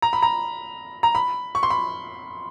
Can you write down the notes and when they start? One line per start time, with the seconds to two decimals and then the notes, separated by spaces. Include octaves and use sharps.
0.02 A#5
0.13 B5
0.22 A#5
1.03 A#5
1.15 B5
1.55 C#6
1.63 C6
1.70 B5